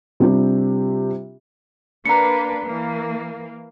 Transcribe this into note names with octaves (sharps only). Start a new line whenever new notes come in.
C3 G3 C4 D4 F4 G4
A#3 D4 B4 A#5 C#7
E3 A#3